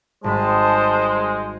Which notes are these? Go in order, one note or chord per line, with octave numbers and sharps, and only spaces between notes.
G#1 G3 G#3 C5 A5 B5